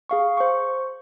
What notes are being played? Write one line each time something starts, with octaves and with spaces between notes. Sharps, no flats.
G#4 F5 C#6
C5 C#6